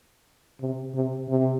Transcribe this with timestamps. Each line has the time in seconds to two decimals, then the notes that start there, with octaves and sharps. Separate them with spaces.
0.61 C3
0.94 C3
1.29 C3